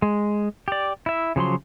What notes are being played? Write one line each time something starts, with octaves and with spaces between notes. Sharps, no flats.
G#3
G4 D5
E4 E5
C#3 F3 F#3 C6